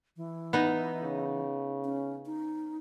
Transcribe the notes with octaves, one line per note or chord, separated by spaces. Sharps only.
E3
B3 D#4
C#3
C#4
D#4